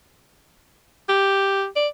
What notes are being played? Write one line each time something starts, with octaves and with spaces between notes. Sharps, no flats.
G4
D5